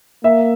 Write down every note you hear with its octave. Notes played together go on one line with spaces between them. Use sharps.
A#3 E5